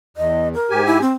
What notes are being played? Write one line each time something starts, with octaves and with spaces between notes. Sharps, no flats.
E2 D#5
A#4
G#2 G4 G#5
E4
C4